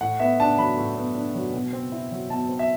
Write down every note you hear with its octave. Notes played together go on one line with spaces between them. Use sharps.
A2 F#5
B3 E5
D4 A5
F#3 B5
A2
B3
D4
F#3
B2
C4
E4
F#3
B2 A5
C4
E5